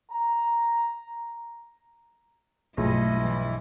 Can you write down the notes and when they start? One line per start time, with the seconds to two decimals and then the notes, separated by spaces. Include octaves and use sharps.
0.10 A#5
2.77 B1 G2 F3 A3 E4 G#4 D#5
3.20 E3